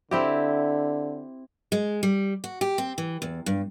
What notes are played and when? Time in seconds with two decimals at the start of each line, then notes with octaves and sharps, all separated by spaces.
0.11 D3 C4 E4 G4
1.72 G#3
2.03 G3
2.44 F#4
2.61 G4
2.78 C4
2.98 E3
3.22 E2
3.46 G2